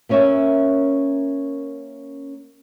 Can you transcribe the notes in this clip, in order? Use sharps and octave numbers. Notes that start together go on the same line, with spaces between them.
A#3 B3 C#4 A#4 C#5 E5